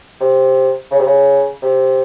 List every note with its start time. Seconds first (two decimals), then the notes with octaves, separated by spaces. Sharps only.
0.21 C3
0.91 C#3
0.99 C3
1.06 C#3
1.62 C3